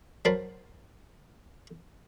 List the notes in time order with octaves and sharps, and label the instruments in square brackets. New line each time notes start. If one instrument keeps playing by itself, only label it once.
[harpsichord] F#3 A#4 C5 A5 B5